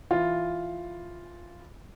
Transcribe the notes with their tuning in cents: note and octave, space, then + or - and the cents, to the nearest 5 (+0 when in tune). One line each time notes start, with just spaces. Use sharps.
E3 +5 F4 +0